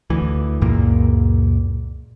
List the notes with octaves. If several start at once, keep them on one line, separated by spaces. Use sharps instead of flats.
D2 E3
C#2 F#2 A#2 A#3